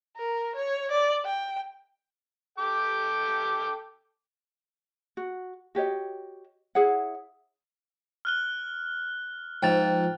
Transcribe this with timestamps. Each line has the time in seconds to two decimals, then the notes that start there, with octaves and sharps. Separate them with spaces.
0.17 A#4
0.55 C#5
0.91 D5
1.25 G5
2.59 A4 G5 D6
5.17 F#4
5.75 F#4 G4 C#5 D#5
6.75 E4 G#4 C#5 F#5
8.25 F6 F#6 G7
9.63 G#2 F3 G5 A6